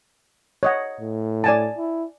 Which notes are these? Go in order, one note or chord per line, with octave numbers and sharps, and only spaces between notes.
C#5 D#5 F#5
A2
D5 G#5 A5
E4